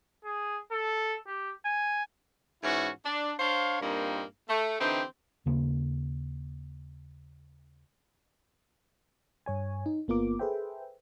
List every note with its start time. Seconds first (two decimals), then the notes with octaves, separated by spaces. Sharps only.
0.25 G#4
0.72 A4
1.27 G4
1.65 G#5
2.63 G#2 E3 C#4 E4 F#4
3.05 D4
3.39 D4 C5 C#5 F5
3.81 G2 A#2 A#3 C4 D#4
4.49 A3
4.80 D3 E3 C4 D#4 G4
5.46 D#2 C#3 A#3
9.46 G2 C#5 G#5
9.86 D#4
10.08 G1 A#3 B3 F4 A#4 D6
10.39 G#4 A4 B4 C5 E5 G5